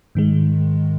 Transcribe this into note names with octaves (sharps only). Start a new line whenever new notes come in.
G#2 D#3 G#3